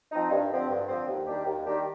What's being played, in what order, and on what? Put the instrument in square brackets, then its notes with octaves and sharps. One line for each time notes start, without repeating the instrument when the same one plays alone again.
[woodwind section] F3 C4 D#4
G2
D3 F3 C4
G2
D3 F3 C4
D#2
D#3 G3 D4 G4
D#2
D#3 G3 D4 G4